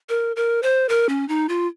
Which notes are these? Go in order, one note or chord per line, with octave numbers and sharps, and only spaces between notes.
A#4
A#4
C5
A#4
C#4
D#4
F4